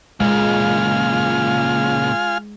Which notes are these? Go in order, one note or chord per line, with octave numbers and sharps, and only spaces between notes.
A#2 C#3 G#3 F4 G#5 F6